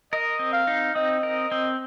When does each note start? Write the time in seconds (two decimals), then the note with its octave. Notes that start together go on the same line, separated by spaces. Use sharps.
0.13 A#4 D#5
0.39 C4
0.53 F5
0.67 D#4
0.95 C4 D#5
1.23 A#4
1.52 C4